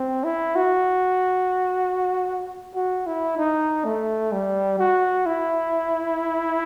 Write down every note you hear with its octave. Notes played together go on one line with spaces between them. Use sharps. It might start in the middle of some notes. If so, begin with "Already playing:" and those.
Already playing: C4
E4
F#4
F#4
E4
D#4
A3
G3
F#4
E4